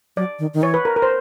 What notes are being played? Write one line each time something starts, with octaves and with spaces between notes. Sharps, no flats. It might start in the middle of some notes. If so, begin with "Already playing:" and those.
F#3 D5
D#3
D#3
E3 C#5
B4
A#4
A#4
C5